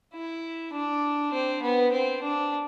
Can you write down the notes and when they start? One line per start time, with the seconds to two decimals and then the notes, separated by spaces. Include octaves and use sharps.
0.13 E4
0.73 D4
1.33 C4
1.62 B3
1.92 C4
2.22 D4